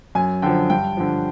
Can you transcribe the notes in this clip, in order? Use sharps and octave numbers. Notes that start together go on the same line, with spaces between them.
F#2 G#5
D3 F3 G5
G2 G5
D3 F3